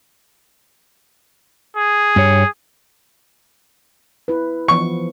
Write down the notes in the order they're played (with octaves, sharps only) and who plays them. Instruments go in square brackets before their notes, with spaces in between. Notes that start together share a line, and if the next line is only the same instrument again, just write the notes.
[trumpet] G#4
[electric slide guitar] G2 C#5
[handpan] E4 B4
[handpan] E3 F3 B3 [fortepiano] C#6